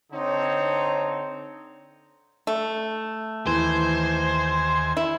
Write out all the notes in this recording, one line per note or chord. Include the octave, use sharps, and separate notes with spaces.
D3 C4 D#4 C#5
A3
D#2 E3 C5 G#5
E4